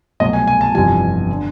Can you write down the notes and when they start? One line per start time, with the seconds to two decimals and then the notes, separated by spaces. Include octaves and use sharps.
0.20 C2 B2 F#3 A3 D#5
0.33 G#5
0.48 G#5
0.61 A5
0.75 G1 F2 C3 E3 G3 G#5
1.33 D3